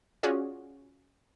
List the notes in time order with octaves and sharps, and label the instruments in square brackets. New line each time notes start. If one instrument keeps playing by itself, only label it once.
[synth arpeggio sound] C#4 F4 F#4 G#4 D5